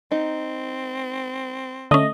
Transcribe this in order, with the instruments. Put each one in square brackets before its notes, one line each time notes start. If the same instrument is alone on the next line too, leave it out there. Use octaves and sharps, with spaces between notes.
[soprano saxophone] C4 [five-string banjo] D#4
[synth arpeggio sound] D3 C#4 [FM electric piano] A3 D#5